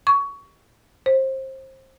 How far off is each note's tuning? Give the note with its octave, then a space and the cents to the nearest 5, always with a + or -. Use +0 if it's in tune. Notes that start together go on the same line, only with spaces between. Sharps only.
C#6 +20
C5 +25